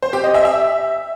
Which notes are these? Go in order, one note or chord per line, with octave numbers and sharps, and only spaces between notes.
C5
G4
D#5
E5
E5